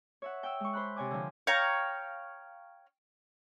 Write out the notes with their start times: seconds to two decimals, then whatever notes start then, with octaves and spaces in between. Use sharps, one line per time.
0.22 C#5 E5 F#5
0.43 G5 E6
0.60 G#3 C#6
0.73 C5 B5 F#6
0.96 C3 C#5 G#5 D6
1.11 D3 F3
1.47 C#5 F5 G5 A#5